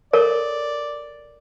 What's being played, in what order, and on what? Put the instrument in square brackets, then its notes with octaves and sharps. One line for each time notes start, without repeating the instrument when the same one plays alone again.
[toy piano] A4 A#4 C#5 [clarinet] D5